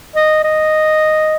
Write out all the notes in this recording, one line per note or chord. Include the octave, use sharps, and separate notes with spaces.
D#5
D#5